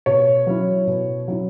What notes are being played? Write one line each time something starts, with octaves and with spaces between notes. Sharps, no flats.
B2 C#5
F#3 C#4 E4
B2
F#3 C#4 E4